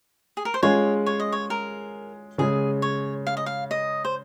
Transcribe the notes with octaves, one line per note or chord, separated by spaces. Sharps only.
G#4
A#4
C5
G#3 C#4 F4 G#4 C#5
C#5
D#5
C#5
A#4
C#3 G#3 C#4 G#4
C#5
F5
D#5
F5
D#5
C5